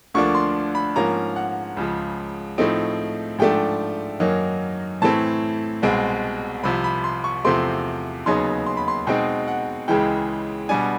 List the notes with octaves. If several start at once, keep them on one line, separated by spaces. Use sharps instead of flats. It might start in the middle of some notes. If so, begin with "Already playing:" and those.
D2 D3 F3 A#3 D4 C#6
C6
B5
G#2 F3 A#3 C#4 A#5
F#5
C#2 C#3 F3
A2 F3 A3 C4 D#4
G#2 F3 A3 D4 G5
F#2 D#3 F#3 A#3 D#4
A2 E3 A3 C4 A5
C2 B2 G#3 C4
C2 C3 F3 B5
B5
C6
C#6
E2 C3 F3 A3 C4 C6
D#2 C#3 F#3 B3 D#4 C6
C6
B5
C6
B2 G#3 C4 D#4 G5
F#5
C#2 C#3 E3 G#3 G5
B2 G3 B3 D4 G#5